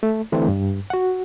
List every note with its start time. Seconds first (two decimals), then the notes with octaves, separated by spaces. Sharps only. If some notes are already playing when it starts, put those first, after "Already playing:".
0.03 A3
0.32 D3 E3 A3 C4
0.48 G2
0.90 F#4 F#5